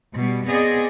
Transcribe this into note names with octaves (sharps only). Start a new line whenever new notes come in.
B2 G3
B3 C4 G#4 D5 D#5